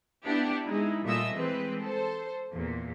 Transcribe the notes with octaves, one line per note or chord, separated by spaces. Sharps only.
B3 D4 E4 G4
G#3 D#4 E4
A#2 G3 A3 D#5 E5 E6
E3 G#3 C4 B4
A4 C5
E2 A#2